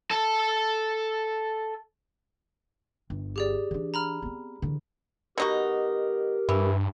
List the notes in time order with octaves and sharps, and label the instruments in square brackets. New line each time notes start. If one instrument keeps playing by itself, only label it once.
[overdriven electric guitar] A4 A5
[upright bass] G1
[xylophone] G4 G#4 D5
[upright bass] E3 D4
[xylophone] A#5 B5 F6
[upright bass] B3 C4
D3 E3
[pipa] B2 D#4 F#4 [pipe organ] G4 A#4
[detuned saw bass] G2 [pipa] E3